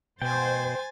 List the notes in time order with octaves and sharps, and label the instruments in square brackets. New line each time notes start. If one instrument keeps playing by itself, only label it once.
[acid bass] B2 [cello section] C5 [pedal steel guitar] G5 [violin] G#5 A6